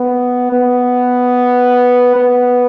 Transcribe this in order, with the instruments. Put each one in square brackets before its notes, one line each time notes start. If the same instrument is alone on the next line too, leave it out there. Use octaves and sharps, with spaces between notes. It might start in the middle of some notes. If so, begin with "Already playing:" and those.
Already playing: [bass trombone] B3
B3
B3